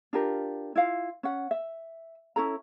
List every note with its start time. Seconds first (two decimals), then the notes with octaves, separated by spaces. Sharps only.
0.13 D4 F4 G4 A#4
0.75 E4 F4 F5
1.23 C#4 F#5
1.51 E5
2.36 C#4 E4 A4 A#5